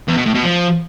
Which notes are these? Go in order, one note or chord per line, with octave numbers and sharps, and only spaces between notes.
E2
B2
A2
B2
F3